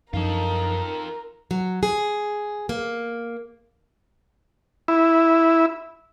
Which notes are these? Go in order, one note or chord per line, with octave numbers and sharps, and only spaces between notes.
F#2 F3 D4 D#4 F4 A4 A#4
F#3
G#4
A#3
E4